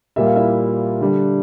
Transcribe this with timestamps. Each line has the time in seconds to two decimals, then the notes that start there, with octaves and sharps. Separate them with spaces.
0.16 A#2 G3 A#3 E5
0.26 F5
0.36 E4 E5
1.01 D3 G3 D4